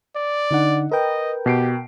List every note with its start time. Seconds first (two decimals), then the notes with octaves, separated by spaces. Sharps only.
0.16 D5
0.51 D3 D#4 F#5
0.91 A#4 B4 D#5 G5
1.46 B2 G4 C7 D7